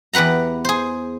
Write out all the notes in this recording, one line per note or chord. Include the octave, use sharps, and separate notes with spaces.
E2 G4 B4 F#5 A#5
G#4 C5